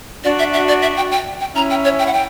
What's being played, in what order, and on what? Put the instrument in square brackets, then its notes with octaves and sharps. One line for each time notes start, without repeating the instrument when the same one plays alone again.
[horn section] D4 F#4 [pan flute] D5
[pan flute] E5
E5
D5
E5
G5
G5
G5
[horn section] C#4 E4 [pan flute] A#5
[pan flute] G5
C#5
G5
F#5
G5